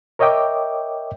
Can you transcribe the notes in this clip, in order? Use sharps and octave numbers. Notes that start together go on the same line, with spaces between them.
A#4 C#5 D#5 E5 G5 D6